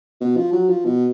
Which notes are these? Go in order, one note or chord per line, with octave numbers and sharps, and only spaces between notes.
B2
F3
F#3
F3
B2